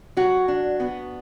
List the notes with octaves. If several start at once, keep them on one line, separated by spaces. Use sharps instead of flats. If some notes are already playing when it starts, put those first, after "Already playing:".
F#3 F#4
D4
B3